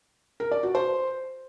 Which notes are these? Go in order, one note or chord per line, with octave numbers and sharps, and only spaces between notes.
A#4
D5
F#4
C5